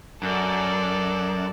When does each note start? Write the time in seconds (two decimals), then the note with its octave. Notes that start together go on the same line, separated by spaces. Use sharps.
0.23 F#2 A4 D5